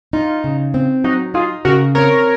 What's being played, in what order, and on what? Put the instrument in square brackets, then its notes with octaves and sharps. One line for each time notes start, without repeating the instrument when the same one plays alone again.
[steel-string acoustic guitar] D#4 [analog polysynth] F4
[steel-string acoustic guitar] C#3
C4
[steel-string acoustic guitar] F#3 [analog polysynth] D#4 F#4
[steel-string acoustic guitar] D#4 [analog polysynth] F4 G#4
[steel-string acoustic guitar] C#3 [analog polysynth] F#4 A#4
[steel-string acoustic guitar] C4 [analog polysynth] A#4 C#5